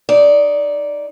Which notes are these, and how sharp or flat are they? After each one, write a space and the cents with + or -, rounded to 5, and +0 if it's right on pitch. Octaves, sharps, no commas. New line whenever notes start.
D#4 +5 D5 -10